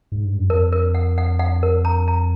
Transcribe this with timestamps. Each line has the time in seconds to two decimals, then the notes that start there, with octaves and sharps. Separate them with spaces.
0.12 G#2
0.25 G2
0.37 F#2
0.50 F2 A#4
0.72 A#4
0.95 F#5
1.18 F#5
1.39 F#5
1.63 A#4
1.85 A#5
2.08 A#5